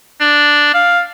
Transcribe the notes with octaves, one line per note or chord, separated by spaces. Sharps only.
D4
F5